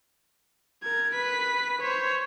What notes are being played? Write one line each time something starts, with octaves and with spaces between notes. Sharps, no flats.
A#4 G#6
B4 B6
C5 C#5